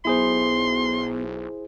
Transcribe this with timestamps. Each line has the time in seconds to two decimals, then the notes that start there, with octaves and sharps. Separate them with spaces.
0.05 B1 B3 E4 G#4 C5 C6